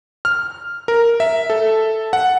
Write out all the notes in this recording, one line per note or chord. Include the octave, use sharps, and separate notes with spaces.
F6
A#4
E5
A4
F#5